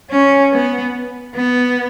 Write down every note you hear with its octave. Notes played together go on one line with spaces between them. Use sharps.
C#4
B3
B3